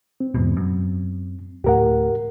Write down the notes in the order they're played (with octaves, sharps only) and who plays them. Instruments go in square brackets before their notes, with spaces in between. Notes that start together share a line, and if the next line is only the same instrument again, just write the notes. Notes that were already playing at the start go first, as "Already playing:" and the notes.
[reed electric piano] C4
[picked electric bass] E2 G#2 B2
F#2
[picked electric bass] D1 A2 [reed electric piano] G4 A#4 F#5